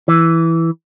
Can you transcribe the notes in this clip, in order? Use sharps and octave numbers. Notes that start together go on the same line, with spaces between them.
E3